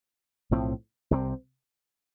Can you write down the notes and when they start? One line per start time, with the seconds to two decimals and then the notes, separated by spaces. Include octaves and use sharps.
0.51 B1 A2 F3 C4
1.11 C2 C3 F3 C4